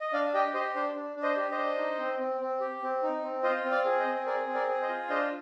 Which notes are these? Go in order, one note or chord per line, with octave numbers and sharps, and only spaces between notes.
D#5
D4 D5 F5
G4 D#5 G5
G4 C5 D#5
D4 C5
D4
D4
C5 D#5
G4
C5 D#5
D4
D#4
C4
C4
C4
G4
C4
D#4
C4
F4 C5 D#5
C4
D5 F5
G#4
C5 D#5
C4
G#4 A#4 D5
C4
A#4 D5
G#4
C5 D#5
F4
D4 C5 D#5